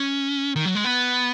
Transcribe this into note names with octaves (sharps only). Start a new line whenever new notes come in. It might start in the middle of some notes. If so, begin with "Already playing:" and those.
Already playing: C#4
D#3
F#3
G#3
B3